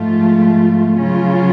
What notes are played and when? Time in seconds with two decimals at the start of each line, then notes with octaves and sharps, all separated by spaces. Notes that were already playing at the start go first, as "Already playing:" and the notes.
Already playing: G#2 F3 A3 F4
0.98 C#3 F#3 C#4 F4